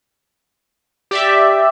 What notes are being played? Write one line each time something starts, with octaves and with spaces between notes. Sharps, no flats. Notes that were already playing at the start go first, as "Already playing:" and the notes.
G4 D5 E5